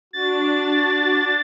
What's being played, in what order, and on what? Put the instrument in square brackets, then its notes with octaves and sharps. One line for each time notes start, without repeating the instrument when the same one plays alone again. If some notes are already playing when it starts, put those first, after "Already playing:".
[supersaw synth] D4 [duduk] F#4 [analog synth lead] A6